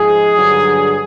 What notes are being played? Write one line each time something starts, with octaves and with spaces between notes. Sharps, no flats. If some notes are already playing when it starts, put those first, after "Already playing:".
Already playing: G#2 F3 G#3 G#4
G2 D3 F#3